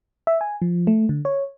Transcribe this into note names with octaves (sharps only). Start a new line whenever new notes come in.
E5
G#5
F3
A3
D3
C#5